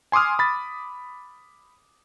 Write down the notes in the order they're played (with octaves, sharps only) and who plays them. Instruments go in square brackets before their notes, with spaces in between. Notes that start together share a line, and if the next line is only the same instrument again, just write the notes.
[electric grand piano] G#5 C6 D6 D#6 F6
B5 A6